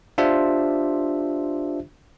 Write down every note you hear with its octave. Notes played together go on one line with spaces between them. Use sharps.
D4 F4 G4 C5 E5